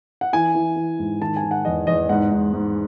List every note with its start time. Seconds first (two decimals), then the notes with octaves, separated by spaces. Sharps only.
0.21 F#5
0.33 E3 G#5
0.55 E3
0.76 E3
0.99 G#2
1.22 D#3 A5
1.37 G#5
1.44 D#3
1.51 F#5
1.65 E2 D#5
1.87 E2 D#5
2.09 G#2 F#5
2.31 G#2
2.54 G#2